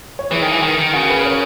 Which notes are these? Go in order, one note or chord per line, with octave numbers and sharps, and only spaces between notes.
C#5
E3 G#4 B4
D#3
E3
D#3
D#3
C#3 F#4 A#4
G#4 B4
B4
A#4 C#5